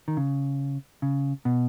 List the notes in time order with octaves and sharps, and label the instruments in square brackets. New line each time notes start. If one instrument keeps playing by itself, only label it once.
[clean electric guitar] D#3
C#3
C#3
B2